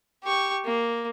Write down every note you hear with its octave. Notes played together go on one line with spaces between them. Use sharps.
G4 C#6
A#3